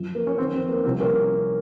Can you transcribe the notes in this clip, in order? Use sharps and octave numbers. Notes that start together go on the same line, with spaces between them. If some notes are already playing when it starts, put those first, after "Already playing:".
Already playing: F#2 F3
A#3
C#4
F2 D#3 C4
C4
A#3
C2 C3 F3 C4
A#3 C#4